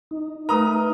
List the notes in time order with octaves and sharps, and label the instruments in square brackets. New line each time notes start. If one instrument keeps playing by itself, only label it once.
[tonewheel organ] D#4
[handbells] A3 A#4 [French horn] B4 [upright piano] A#5 D#6